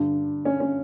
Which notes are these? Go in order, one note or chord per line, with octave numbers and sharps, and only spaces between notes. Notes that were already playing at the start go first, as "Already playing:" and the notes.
Already playing: G2 D3
C#4
C#4